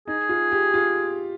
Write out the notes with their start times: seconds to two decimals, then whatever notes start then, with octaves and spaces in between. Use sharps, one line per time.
0.08 D#4 G#4
0.29 F4
0.52 G4
0.74 F4